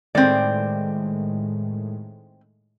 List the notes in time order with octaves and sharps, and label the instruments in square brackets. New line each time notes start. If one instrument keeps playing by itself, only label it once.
[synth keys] A2 D#3 G#3 [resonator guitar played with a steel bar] C4 D5